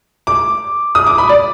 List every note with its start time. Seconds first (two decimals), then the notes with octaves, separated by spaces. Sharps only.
0.27 D6
0.95 D#6
1.06 D6
1.18 B5
1.29 D5